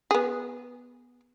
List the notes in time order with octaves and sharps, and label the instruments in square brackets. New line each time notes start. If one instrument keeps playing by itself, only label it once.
[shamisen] B3 G#4